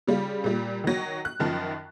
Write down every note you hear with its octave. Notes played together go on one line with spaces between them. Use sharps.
C#3 G3 F4
A#2 G3
D#3 F#3
F#6
F#2 D#3 F3